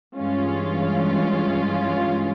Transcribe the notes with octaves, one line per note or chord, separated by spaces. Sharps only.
G2 E3 G#3 C#4 F4